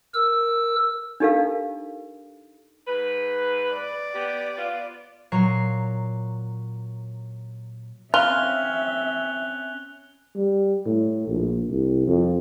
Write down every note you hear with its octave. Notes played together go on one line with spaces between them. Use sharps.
A#4 E6
D4 D#4 G4 A4 A#4 F5
G#2 B4
D5
B3 G4
B3 F4
A#2 F#3 C#5 A#5 C7
C4 C#4 F4 E5 F6 F#6 F7 G7
G3
A2
A#1
C2
F2